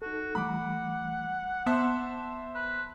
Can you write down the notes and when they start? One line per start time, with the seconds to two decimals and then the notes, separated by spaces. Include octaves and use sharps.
0.02 D#4 F#4 A4
0.35 E3 G3 A3 F#5 B5 D6
1.66 B3 C5 E5 A5 C6 D6
2.55 B4